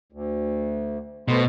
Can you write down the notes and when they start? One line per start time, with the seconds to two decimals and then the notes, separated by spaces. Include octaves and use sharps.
0.12 D2
1.28 B2 A3 B3 C5